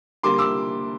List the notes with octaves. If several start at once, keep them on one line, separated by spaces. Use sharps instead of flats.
D3 G3 A#3 C6 D6
D6 E6